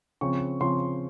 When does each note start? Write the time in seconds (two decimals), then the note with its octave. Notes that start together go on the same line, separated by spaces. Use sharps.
0.21 C#3 F3 C4 C#6
0.61 C#3 F3 C4 C6